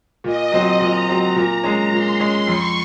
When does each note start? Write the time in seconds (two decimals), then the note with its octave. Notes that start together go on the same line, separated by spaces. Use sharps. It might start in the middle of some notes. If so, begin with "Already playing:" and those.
0.24 A#2 D#5
0.52 F#3 C4 F#4
0.81 A#2 A#5
1.09 F#3 C4 F#4
1.36 A#2 A#5
1.64 G#3 C#4
1.92 A#2 C6
2.20 G#3 C#4
2.47 F2 C#6